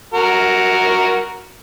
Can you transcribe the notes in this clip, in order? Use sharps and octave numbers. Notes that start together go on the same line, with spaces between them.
F#4 A#4